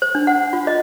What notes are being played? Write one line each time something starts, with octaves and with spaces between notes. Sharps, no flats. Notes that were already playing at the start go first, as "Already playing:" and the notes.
C5
D4
F#5
F4
D#5